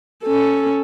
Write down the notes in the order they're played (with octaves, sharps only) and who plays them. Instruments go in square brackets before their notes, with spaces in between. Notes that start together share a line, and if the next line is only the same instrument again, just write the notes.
[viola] C#4 A4